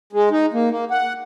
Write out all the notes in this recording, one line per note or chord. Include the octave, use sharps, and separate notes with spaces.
G#3
D#4
A#3
A#3
F#5